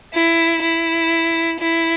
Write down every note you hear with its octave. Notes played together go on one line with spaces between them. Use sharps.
E4
E4
E4